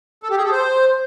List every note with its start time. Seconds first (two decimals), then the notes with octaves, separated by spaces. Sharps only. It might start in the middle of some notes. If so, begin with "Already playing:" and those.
0.23 A4
0.30 G4
0.37 G#4
0.44 A4
0.52 C5